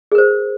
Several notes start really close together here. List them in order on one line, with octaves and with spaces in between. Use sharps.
G#4 A#4 C5